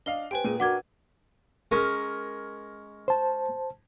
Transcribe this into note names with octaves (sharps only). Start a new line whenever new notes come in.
D4 D#5 F5 G7
G4 B4 C5 G5 G#5
A#2 G#4 D#7
D4 F#4 A#4 F#5 D6 G#6
G#3 C#4 A#4
C5 A5